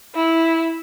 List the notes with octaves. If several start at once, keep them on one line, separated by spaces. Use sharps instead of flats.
E4